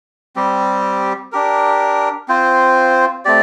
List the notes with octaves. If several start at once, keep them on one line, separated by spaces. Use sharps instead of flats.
G3 C4 G4
D4 G4 A#4
C4 F4 C5
A3 C4 G4 D5